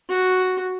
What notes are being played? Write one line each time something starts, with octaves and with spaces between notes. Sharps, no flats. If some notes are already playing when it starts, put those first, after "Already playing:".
F#4